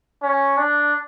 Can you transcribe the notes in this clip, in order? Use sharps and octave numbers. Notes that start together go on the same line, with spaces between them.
C#4
D4